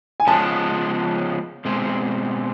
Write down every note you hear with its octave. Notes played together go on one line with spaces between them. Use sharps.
G#5
C#3 F3 G#3 B3 A5
B2 G#3 C4